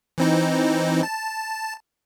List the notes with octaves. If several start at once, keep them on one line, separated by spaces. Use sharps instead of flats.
E3 C4 D#4
A5